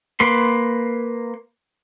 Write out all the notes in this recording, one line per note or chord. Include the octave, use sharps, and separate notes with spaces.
A#3 B4 C6